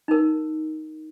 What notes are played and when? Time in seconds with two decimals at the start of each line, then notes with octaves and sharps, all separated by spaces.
0.08 D#4 A#4